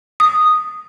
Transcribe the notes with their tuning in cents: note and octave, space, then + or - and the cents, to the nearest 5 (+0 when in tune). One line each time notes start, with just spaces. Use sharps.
D#6 -5